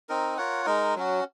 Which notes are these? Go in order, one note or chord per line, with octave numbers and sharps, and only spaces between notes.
C4 D#4 A#4
F4 A#4 C#5 F#5
G#3 D#4 A#4
F#3 C#4 F#4